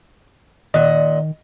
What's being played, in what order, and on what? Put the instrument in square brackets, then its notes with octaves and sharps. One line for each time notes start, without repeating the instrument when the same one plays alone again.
[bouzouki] A#2 F#5 [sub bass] D#3 [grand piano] D#5